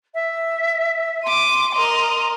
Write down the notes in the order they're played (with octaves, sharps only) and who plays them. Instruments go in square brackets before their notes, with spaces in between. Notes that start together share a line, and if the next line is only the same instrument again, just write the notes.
[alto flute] E5
[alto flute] C6 [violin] D6 D#7
[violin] A#4 D#5